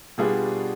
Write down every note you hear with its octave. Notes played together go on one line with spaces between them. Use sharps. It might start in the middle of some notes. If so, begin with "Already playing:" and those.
B2 G3 B3 D4 F4 G#4